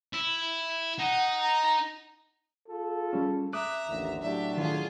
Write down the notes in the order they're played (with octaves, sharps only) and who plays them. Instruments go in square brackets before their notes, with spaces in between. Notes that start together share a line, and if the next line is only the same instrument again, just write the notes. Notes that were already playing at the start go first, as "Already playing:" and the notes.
[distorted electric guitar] E4
[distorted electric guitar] D#4 [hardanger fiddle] F#5
[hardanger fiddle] A#5
[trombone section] F4 G#4 A4
[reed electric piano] G3 C#4
[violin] E5 A#5 [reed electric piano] D6 D#6 F#6
[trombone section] A1 D#2 D3
[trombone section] A2 F#3 D4 [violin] G4 E5
[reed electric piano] D#3 A4 [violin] F4 G#4